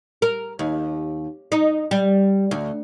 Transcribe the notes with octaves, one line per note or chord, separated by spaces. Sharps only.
A#4
D#2
D#4
G3
D2